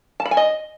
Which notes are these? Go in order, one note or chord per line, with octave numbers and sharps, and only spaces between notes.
A5
B5
G#5
D#5